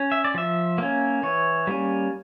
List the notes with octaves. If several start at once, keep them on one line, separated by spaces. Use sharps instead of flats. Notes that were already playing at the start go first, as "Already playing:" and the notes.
Already playing: C#4
E5
D5
F3 E5
A#3 C#4
E3 C#5
G3 A#3 C#4